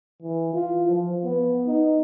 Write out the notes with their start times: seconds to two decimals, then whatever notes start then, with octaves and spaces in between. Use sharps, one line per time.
0.23 E3
0.54 F4
0.88 F3
1.25 B3
1.67 D#4